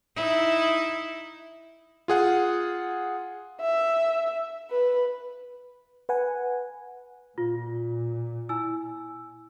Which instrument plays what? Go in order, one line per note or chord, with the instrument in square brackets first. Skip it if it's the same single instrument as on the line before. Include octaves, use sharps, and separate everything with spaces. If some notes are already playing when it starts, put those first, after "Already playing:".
[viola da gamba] D#4 E4
[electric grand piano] F4 G#4 F#5
[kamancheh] E5
B4
[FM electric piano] B4 F#5 G#5
[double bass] A#2 [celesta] F4
[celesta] E4 G#5 E6